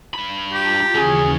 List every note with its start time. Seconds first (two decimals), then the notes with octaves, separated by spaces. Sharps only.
0.14 G2 B5
0.53 F4 G4 A5 A#5
0.95 D#2 C#3 E3 F#3 C#4 G#4